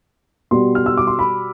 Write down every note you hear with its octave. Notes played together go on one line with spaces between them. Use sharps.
B2 G3 B3 C6
F6
E6
D6
C6
B5